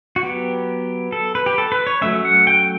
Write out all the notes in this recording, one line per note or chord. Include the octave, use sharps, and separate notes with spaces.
F#4
F#3 B3 G4
A4
B4
G4
A4
B4
C#5
F#3 A3 C#4 E5
F#5
G5